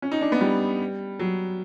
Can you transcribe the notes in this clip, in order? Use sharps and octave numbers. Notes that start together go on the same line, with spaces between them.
C#4
D#4
D4
B3
G3
F#3